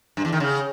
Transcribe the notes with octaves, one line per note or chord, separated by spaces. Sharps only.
G2
E2
D#3
C#3